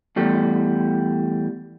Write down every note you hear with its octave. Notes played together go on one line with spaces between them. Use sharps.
E2 G3 A3